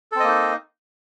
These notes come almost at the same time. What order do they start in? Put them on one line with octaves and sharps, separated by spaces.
A4 C4 D#5 A#3 D#4